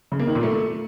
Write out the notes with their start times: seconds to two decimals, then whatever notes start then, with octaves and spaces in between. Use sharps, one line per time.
0.12 C#3
0.19 A#3
0.27 D#3
0.35 A#2
0.43 A3